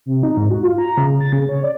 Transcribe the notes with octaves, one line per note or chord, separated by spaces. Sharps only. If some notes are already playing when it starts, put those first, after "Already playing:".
C3
D#4
G#2
F#4
F4
A#5
C#3
A6
C#3
C#5
D5